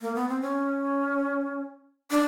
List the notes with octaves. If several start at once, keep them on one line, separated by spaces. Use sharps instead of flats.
A#3
B3
C4
C#4
D4